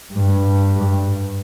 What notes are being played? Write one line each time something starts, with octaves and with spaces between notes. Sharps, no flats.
G2